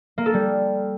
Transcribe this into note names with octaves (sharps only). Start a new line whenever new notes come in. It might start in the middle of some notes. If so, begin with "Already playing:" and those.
A#3
A4
G3